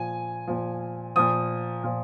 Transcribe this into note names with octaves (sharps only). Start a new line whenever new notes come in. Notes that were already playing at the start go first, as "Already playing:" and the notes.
Already playing: A#2 F3 G#5
A#2 F3
A#2 F3 D#6
A#2 F3